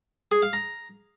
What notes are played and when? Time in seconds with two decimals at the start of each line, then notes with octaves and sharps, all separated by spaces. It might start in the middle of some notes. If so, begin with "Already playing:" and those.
0.32 G#4
0.42 F5
0.53 A#5